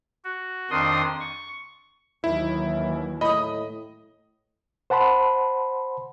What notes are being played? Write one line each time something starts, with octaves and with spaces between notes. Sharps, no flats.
F#4
F2 D#3 D4 C6 D#6
C#6
D#2 E3 F#3 E4
A2 D#5 B5 D#6
C5 F#5 A5 B5 C6